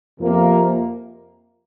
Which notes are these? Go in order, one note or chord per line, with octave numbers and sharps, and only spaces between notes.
F2 C3 F3 A#3